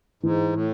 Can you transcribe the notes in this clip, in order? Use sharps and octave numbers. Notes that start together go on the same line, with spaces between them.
G#2 E3
A2